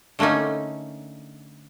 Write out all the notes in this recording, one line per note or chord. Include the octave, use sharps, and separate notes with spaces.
D3 A3 A#3 C#4 D#4